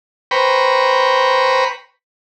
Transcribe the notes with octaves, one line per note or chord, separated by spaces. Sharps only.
B4 C5 G5 A#5 B5 C#6